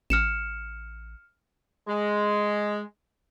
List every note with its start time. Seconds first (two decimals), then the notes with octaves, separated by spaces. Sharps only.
0.10 A1 F6 C#7 E7
1.87 G#3